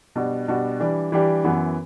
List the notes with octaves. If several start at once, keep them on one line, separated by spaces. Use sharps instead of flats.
B2 G3 D4 F#4
B2 G3 D4 F#4
E3 G3 D4 G4
E3 G3 D4 G4
F#2 E3 B3 F#4